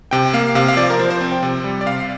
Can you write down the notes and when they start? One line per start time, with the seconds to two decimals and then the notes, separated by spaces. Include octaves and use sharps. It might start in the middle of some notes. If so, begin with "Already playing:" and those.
0.11 C3 G5
0.33 A#3 F5
0.55 C3 F5
0.68 F5
0.77 F3 D5
0.90 A#4
0.99 F3 C5
1.10 C5
1.21 C4
1.31 G5
1.43 C3
1.64 G3
1.81 D5
1.86 C3 F5